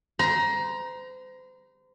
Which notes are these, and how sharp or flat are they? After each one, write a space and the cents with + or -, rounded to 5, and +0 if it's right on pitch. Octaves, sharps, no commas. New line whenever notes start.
C5 -35 A#5 +20